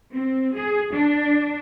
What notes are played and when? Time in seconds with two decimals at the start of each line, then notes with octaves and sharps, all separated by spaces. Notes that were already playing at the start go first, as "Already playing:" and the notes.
0.12 C4
0.56 G#4
0.93 D4